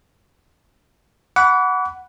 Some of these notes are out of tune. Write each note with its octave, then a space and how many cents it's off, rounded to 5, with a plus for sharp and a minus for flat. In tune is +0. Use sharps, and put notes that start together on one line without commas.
F#5 +0 B5 +0 D6 -45